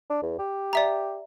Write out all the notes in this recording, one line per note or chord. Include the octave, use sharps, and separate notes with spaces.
D4
E2
G4
D5 E5 A#5